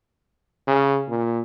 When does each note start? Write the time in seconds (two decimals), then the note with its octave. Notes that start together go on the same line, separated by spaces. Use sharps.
0.67 C#3
1.09 A#2